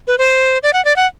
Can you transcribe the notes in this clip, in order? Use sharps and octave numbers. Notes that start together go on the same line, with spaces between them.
B4
C5
D5
F#5
D5
F#5